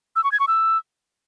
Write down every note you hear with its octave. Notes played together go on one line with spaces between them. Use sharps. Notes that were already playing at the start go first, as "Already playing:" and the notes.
E6
C#6
G#6
C#6
E6